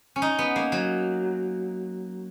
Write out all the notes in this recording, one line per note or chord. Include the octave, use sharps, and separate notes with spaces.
C#4
D#4
B3
A#3
F#3